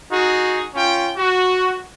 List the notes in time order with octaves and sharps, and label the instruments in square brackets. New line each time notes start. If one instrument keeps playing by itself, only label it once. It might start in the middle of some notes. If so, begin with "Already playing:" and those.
[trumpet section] D#4 F#4 G#4
C#4 F4 G5
F#4